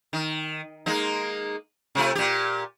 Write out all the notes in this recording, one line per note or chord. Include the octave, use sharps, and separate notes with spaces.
D#3
G#3 A#3 D#4
C3 A3 F4
A#2 G4